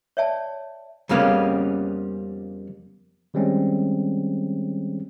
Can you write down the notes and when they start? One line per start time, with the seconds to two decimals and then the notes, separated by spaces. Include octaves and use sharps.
0.17 C#5 D5 E5 G5 A5
1.09 F2 C#3 G3 A#3 B3 C#4
3.34 D#3 G3 G#3 C4 C#4